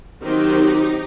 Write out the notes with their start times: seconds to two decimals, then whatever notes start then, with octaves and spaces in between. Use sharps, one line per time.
0.24 D#3 F#3 C4 D#4 G4